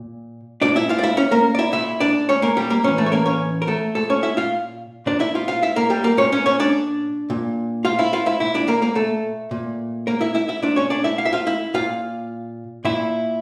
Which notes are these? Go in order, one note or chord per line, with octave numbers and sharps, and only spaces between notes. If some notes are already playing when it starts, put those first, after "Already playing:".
Already playing: A#2
A#2 D4 D5
E4 E5
F4 F5
D5
E4 E5
C#4 C#5
A#3 A#4
D5
E4 E5
A#2 E4 E5
D4 D5
C#4 C#5
A#3 A#4
G3 G4
A#3 A#4
A2 E3 C#4 C#5
A3 A4
C#5
A#3 A#4
C#4 C#5
A#4
A3 A4
A#2 A3 A4
C#4 C#5
E4 E5
F4 F5
A#2 D4 D5
E4 E5
F4 F5
F4 F5
E4 E5
A#3 A#4
G3 G4
A#3 A#4
A#2 C#4 C#5
C#4 C#5
C#4 C#5
D4 D5
A#2
F4 F5
E4 E5
F4 F5
E4 E5
A#2 E4 E5
D4 D5
A#3 A#4
A#3 A#4
A3 A4
A#2
A#3 A#4
E4 E5
E4 E5
E4 E5
A#2 D4 D5
C#4 C#5
D4 D5
E4 E5
F5
E5
F4 F5
E4 E5
A#2 F4 F5
A#2 E4 E5